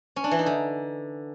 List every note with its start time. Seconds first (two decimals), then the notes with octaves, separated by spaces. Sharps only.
0.16 C#4
0.24 D4
0.31 E3
0.39 D#4
0.46 D3